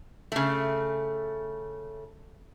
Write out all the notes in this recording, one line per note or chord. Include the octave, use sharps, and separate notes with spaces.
C#3 A3